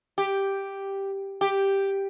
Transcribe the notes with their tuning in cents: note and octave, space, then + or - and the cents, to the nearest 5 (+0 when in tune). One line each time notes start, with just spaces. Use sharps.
G4 +0
G4 +0